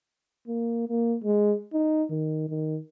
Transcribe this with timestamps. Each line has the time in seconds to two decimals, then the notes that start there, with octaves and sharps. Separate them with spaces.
0.48 A#3
0.89 A#3
1.24 G#3
1.73 D#4
2.10 D#3
2.49 D#3